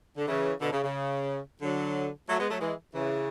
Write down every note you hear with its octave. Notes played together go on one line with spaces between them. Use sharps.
D3
C#3 E3
B2 D3
C#3
C#3
D3 F#3
F#3 A3
G#3 B3
F#3 A3
E3 G#3
C#3 E3